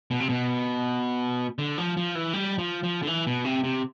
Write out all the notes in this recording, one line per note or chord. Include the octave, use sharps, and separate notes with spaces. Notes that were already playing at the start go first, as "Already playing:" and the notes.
B2
C3
B2
D3
F3
F3
E3
G3
F3
F3
D3
E3
B2
C3
C3